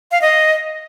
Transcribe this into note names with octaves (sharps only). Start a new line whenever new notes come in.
F5
D#5